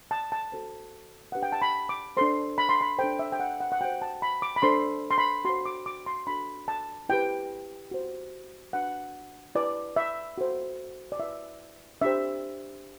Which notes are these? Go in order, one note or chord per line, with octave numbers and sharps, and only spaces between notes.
A5
A5
F#4 A4 C5
D4 G4 B4 F#5
G5
A5
B5
D6
D4 A4 C5 C6
B5
C6
B5
D4 A4 C5 G5
E5
G5
F#5
F#5
F#5
F#4 C5 G5
A5
B5
D6
B5
D4 A4 C5 C6
C6
B5
F#4 C5 C6
D6
D6
C6
D4 F#4 A4 B5
A5
E4 G4 B4 G5
F#4 C5
D4 F#4 B4 F#5
E4 B4 D5
E5
F#4 A4 C5
D5
E4 B4 E5
D4 G4 C5 E5